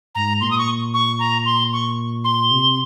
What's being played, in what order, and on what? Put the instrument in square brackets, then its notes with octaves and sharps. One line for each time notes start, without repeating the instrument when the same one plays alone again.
[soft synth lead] G#2 [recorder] A#5
[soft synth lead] A#2 [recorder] C6
[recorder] D#6
C#6
C#6
A#5
C6
C#6
C6
[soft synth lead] C3